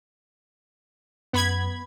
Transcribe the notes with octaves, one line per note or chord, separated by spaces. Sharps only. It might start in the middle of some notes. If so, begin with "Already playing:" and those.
F#2 B3 B5 G#6